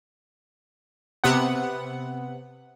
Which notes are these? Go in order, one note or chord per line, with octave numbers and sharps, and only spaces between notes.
C3 B3 F#5